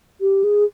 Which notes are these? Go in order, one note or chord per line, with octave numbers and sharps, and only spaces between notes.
G4
G#4